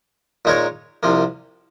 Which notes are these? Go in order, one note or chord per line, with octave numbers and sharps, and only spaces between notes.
A#2 G#3 D#4 A#4 C#5
C2 C3 F3 A#3